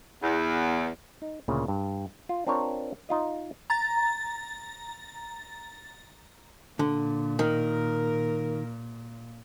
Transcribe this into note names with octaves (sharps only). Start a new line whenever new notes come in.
E2
D#4
D2 A#2 C#3
G2
F4
C4 D4 F4 A#4 C#5
D#4 F4 D#5
A#5 A6
A#2 D3
D#3 A#4